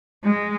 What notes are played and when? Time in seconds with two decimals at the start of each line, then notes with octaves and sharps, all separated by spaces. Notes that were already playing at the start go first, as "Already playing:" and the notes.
0.24 G#3